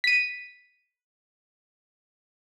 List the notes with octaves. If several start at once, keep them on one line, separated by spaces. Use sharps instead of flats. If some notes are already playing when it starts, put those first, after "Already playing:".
B6 D#7